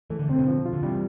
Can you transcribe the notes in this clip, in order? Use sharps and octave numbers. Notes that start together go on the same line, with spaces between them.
E3 A3
D3
C3 C4
B2 D3
F3
F4
D3
C3 E3 G3